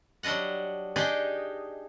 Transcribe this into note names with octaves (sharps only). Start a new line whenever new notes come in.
F#3 G3 D4 D#5 F#5
D4 D#4 G4 G#4 D5 D#5